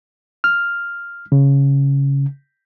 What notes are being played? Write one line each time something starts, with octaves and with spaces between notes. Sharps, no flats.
F6
C#3